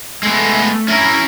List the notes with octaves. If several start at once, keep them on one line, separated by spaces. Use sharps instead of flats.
G#3 A3 B3
C#4 E4 A#4